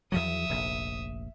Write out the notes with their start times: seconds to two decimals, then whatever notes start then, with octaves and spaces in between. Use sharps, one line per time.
0.12 E2 F3 F#3 E5 D#6
0.49 F1 A#1